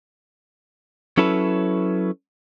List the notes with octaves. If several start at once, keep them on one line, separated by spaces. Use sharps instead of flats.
F#3 C#4 E4 A4 B4